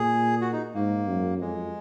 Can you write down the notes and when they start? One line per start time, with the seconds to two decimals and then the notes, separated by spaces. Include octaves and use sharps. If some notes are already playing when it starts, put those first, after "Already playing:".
Already playing: A#2 G#4
0.41 F#4
0.52 D#4
0.74 G#2 A#3
1.07 F#2
1.41 F2 G#3